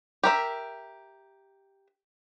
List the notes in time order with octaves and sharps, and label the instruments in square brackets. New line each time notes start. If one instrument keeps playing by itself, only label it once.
[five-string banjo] G4 A#4 E5